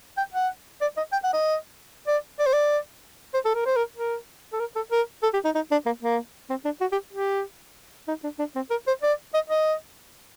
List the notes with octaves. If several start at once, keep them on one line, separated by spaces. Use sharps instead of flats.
G5
F#5
D5
D#5
G5
F#5
D#5
D5
D5
C5
D5
C5
A4
A#4
C5
A#4
A#4
A4
A#4
A4
A#4
A4
G4
D#4
D#4
D4
A#3
A#3
C4
D4
F#4
G4
G4
D#4
D4
D4
C4
A#4
C5
D5
D#5
D#5